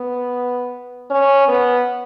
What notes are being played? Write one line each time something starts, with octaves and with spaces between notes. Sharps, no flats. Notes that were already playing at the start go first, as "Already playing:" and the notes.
Already playing: B3
C#4
B3